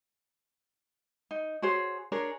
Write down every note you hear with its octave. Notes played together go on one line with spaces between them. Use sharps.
D#4
F#4 G#4 C5 C#5
D4 G#4 A#4 C#5